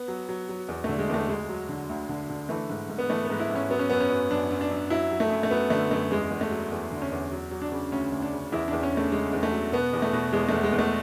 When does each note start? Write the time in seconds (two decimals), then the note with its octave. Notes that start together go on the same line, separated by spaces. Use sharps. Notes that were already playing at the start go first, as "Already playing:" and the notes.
Already playing: B3
0.08 F#3
0.29 F#3
0.49 F#3
0.69 E2
0.84 D3 A3
0.99 G#3
1.09 E2 A3
1.29 D2 G#3
1.49 F#3
1.69 D3
1.89 D2
2.09 D3
2.30 D3
2.49 E3 A3
2.70 G#2
2.90 G#2
2.98 B3
3.10 E3 A3
3.25 B3
3.30 G#2
3.40 E4
3.50 G#2 C#4
3.70 F#3 B3
3.79 C#4
3.90 F#2 B3
4.00 C#4
4.10 F#2
4.31 F#2 D4
4.50 F#2
4.61 D4
4.71 F#2
4.90 F#3 E4
5.11 F#3
5.20 A3
5.30 F#2
5.43 A3
5.51 F#3 B3
5.70 D3 A3
5.91 F#2 A3
6.11 E2 G#3
6.31 E2
6.41 A3
6.51 F#3
6.72 E2
6.92 D3
7.02 C#4
7.12 E2
7.32 F#3
7.51 F#3
7.62 D4
7.72 C#3
7.92 D2 C#4
8.12 D2
8.22 D4
8.33 C#3
8.52 E2 E4
8.68 D4
8.73 E2
8.83 C#4
8.93 C#3 A3
9.12 C#3 G#3
9.33 E2
9.43 A3
9.52 F#3
9.72 B2 B3
9.93 E2
10.02 A3
10.13 B2
10.33 E2 G#3
10.49 E2 A3
10.63 G#3
10.73 E2
10.79 A3